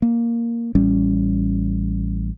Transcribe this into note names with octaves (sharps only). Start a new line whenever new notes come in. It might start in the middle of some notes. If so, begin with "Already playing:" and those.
A#3
A1 G3 C#4